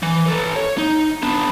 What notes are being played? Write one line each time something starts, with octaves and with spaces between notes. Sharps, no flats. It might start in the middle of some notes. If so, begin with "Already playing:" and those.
E3
A4 B4
C#5
D#4
B3 D4